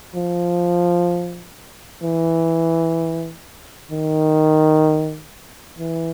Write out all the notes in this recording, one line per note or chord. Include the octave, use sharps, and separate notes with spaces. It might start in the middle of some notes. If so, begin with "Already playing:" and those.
F3
E3
D#3
E3